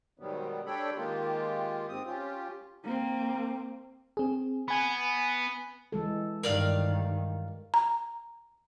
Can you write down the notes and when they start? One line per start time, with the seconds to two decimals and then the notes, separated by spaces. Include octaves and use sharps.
0.19 G#2 B2 D#3 F#3 G3 B3
0.66 D4 G4 A4 C#5 G5 B5
0.97 D#3 G#3 A#3 F4 G4
1.89 G#2 C4 D#6
2.06 C#4 F4 G4
2.84 A#3 C4
4.17 C4 G#4
4.68 B3 G#5 B5
5.92 E3 G#3 A4
6.43 G2 D#3 A#4 D5 F5
7.74 A#5